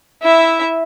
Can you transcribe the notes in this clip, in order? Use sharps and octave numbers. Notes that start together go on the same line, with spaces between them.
E4 E5